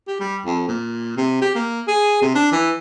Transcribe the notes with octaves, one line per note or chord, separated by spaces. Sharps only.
G4
G3
F2
A#2
C3
G4
A#3
G#4
C3
D4
E3